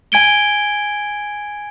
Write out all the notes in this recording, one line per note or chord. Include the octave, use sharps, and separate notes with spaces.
G#5 G#6 D7 G7